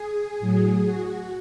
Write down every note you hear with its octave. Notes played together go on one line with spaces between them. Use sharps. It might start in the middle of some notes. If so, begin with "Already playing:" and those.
Already playing: G#4
A2 F#3
F#4